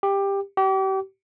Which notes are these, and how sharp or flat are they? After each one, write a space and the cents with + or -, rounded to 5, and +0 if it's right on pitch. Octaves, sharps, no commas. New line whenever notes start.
G4 +15
G4 -35